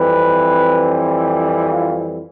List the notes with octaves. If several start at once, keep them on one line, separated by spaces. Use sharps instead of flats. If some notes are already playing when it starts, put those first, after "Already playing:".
Already playing: F2 E3 G3 C4 B4
F4